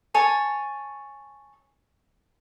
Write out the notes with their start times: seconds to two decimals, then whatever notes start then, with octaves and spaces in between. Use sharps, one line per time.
0.14 C#5 G#5 A5